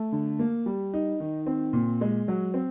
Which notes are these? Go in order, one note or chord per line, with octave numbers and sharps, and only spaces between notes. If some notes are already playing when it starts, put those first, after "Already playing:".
Already playing: A3
D3
A#3
G3
D#4
D#3
C4
A#2
G#3
F#3
C4